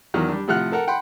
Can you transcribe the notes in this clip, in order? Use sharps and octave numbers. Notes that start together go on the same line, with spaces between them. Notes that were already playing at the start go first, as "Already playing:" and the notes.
E2 D#3 F#3
G3 D4
A2 C3 F3 F#5 F6 F#6
A4 A#4 F#5
F#5 G5 B5 C6